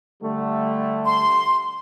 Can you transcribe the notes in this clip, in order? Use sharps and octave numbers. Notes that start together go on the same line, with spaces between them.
D3 G3 A3
C6